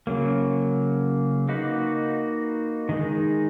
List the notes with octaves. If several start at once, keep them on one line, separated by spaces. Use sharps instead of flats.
C#3 F#3 A#3
A#3 D#4 F#4 B4
D#3 G#3 D#4